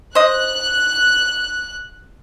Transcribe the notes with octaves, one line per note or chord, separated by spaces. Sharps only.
C5 D#5 F#6